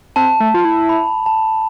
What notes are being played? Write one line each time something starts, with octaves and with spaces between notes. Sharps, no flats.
C4 A5
A3
F4
E4
B5
A5